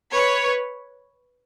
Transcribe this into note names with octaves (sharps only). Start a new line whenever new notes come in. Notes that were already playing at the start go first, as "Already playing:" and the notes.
B4 C#5